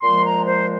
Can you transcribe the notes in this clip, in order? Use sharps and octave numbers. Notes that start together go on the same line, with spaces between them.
A#2 F3 G#3 C6
A#5
C5